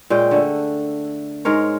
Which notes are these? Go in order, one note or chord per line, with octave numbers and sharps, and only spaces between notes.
A#2 G#3 C#4 G5
D3 A3
G#2 G#3 A#4 C#5